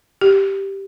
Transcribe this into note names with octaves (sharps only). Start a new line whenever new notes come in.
G4